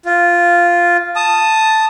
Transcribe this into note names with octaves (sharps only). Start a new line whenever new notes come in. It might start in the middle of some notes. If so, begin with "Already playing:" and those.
F4
A5 D#6